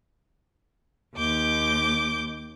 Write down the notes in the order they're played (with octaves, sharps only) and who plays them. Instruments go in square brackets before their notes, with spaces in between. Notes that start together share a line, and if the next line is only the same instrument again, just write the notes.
[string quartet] D#2 D6 G6